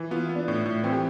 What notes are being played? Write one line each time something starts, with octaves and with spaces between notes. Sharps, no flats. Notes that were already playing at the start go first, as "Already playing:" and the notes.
Already playing: E3
B3 F4
E4
B3
D4
A2
A2
E3 C4
G4